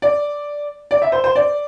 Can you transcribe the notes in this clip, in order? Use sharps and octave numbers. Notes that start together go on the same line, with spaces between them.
D5
D5
E5
C5
C5
D5